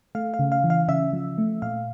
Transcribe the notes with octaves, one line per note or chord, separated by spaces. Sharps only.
A3 F5
F5
C#3
F5
E3
F5
C#3 E5
F3
A3
A#2 F5